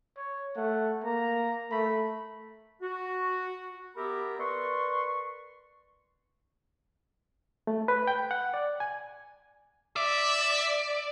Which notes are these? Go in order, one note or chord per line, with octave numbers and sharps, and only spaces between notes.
C#5
A3 F#5
A#3 A#5
A3 B5
F#4
B3 G4 A#4 E5 A#5 B5
A#4 B4 D5 C6 C#6
A3
B4
G5
F#5
D5
G#5
D5 E5